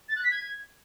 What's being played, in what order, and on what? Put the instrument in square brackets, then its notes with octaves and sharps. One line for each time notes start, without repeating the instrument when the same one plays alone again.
[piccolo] A6
F#6
B6
G#6